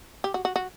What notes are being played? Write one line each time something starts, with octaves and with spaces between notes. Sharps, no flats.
G4
F#4
F#4
F#4